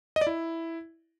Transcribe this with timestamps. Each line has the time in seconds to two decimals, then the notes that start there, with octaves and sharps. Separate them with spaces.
0.16 D#5
0.21 D5
0.27 E4